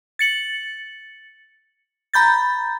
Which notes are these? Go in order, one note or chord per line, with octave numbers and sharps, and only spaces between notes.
A6 C#7 F#7
A#5 B5 G6 A6